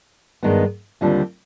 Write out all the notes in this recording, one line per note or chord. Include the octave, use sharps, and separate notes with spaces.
G2 D#3 G#3 B3
D#2 D3 G3 C4 F4